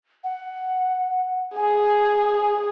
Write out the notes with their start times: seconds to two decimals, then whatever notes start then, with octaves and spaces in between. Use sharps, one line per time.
0.24 F#5
1.56 G#4 G#5